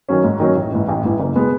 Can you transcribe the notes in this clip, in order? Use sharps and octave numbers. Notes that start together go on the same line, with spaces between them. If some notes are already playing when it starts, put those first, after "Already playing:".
D#3 F#3 C#4
G#2
D#3 F#3 C#4
A1
G#2 E3
A1
G#2 E3
F#1
B2 G#3 B3